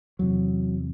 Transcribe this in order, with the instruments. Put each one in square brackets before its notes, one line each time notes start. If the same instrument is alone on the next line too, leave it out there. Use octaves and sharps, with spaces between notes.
[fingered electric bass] E2 C3 F#3